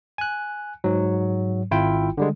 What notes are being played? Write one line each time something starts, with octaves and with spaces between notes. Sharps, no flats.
G#5 F#6
G#2 F#3
G#1 E4 F4 G5
D3 G3 G#3